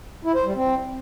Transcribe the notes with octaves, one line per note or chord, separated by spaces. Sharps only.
E4
C5
G3
C4